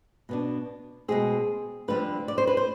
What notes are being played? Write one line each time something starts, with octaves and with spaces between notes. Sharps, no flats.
B2 B3 D4
B2 G#3 C4 G#4
F2 D3 G3 C4 B4
D5
C5
B4
C5